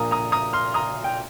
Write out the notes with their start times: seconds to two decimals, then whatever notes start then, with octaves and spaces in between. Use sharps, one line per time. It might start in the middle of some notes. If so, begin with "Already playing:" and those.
Already playing: A#1 A#2 A#3 A#5 D#6
0.11 A#5 D#6
0.32 A#5 D#6
0.53 C6 F6
0.74 A#5 D#6
1.04 G5